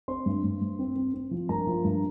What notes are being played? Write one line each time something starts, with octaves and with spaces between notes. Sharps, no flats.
C4 C5 C6
G2
G2
G2
C4
C4
C4
F3
G2 A#4 A#5
F3
G2